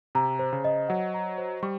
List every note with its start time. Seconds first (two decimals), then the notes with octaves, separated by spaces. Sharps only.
0.15 C3 A#5
0.39 C5
0.53 C#3
0.64 D#5
0.89 F#3 F#5
1.14 A#5
1.38 C5
1.63 G3 C#6